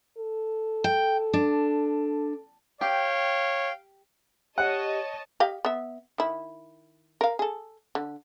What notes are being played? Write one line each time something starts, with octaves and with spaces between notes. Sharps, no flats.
A4
G5
D4
G4 C#5 F5 G5
G4 C#5 D#5 F#5 A5
G4 D#5 F5
B3 E5
D#3 E4
A#4 F5
G#4 A4
D3